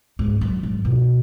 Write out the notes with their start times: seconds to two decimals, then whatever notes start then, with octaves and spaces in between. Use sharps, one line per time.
0.19 G#2
0.41 F#2
0.63 G#2
0.85 B2